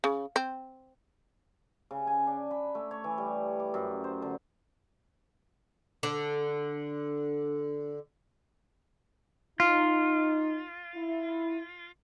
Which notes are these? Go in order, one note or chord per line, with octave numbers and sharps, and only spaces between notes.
C#3
C4
C#3
G#5
D4
B5
A3
C#5
E3
G3
D6
F#2
C5
D3
D3 D4
D#4 F4
E4